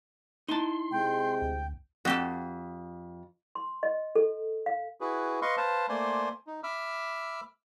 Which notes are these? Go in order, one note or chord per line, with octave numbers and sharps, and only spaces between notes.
D#4 E4 A5 C6
C3 G#3 G5
D2
F2 F#4 G4 A4
C6
D#5
A4
F5
E4 F#4 G#4 B4
B4 D#5 F5 C6 C#6
B4 C5 F5 A5
A3 A#3 C5 D5 G#5 C6
D#4
E5 B5 D6 E6 F6